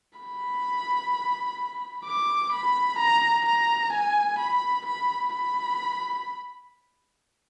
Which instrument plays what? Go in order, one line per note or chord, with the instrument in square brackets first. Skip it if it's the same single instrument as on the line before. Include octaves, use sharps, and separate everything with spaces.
[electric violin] B5
D6
B5
A#5
A#5
G#5
B5
B5
B5